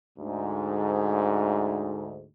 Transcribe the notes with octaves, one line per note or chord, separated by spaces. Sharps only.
D2 G#2